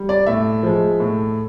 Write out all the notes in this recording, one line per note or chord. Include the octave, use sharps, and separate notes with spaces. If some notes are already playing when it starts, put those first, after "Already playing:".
Already playing: G3
D5
A2 E5
F3 G#3
A2